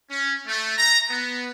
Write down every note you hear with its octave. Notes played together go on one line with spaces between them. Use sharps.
C#4
A3
A#5
B3